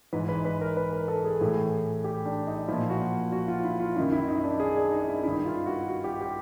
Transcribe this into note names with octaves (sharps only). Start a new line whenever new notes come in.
G#2 E3 B4
B4
B4
A#4
B4
A#4
A4
G#4
A2 E3
G4
D4
D#4
A#2 F3 E4
F#4
F#4
F4
E4
F4
F#2 D#3 E4
E4
D#4
D4
G#4
D4
D#4
E4
G2 D#3 E4
F4
F#4
F#4
G4
G4